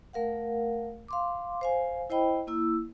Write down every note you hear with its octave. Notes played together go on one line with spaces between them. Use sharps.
A3 A#4 F5 F#5
F5 C6 D6
C5 F5 G#5
E4 C5 D#5 G5 B5
A#3 E4 E6